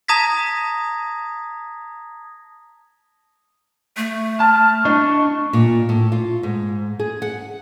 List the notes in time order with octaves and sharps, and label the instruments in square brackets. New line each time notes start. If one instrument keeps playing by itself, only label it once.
[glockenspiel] A5 A#5 D#6 G#6 A#6 B6
[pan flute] A3
[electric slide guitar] A5 [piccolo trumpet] F6
[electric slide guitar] D4 D#5 [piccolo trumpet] C#6
[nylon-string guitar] A#2
A2
F4
G#2
G#4
F#5